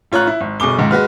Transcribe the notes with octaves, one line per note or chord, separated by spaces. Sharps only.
A1 F4 C#5 A#5 F#6
E4
G#1
G1 B2 G#4 D6 G7
C#2 G#2 D#3
G#3 F#4 B4 F6